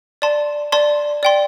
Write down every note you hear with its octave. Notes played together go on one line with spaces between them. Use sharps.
D5 A5 C6
D5 A5 C6
D5 G5 C6